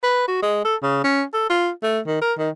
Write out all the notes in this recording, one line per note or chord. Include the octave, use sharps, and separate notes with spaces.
B4
F#4
G#3
A4
C#3
C#4
A4
F4
A3
D#3
A#4
D#3